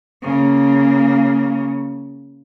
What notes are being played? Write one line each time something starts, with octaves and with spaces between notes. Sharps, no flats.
C#3 A#3